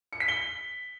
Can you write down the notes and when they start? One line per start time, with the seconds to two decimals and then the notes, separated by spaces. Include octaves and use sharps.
0.13 C#7
0.20 B6
0.28 G7